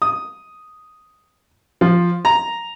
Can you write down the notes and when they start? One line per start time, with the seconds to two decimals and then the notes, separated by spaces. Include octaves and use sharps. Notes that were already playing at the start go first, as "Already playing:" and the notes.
0.02 D#6
1.81 F3
2.25 A#5